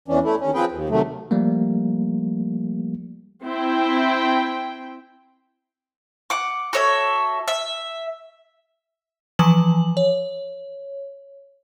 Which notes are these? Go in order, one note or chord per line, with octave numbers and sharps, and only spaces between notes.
E2 E3 C#4 D4
A3 E4
D#2 C#4
F3 C4 G#4 B4 G5
D#2
C3 D#3 F#3 A3
F3 G3 A3 A#3
C4 E4 G5
F#5 D6
F#4 A4 C#5 E5
E5
E3 F3 B4 G#5 F#7
C#5